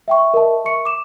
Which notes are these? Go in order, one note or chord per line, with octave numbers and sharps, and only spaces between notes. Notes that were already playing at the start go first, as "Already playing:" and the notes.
E5 G5 C#6
A#4 D#5 E5 A5
A#4 E5 C#6 C#7
D6 E7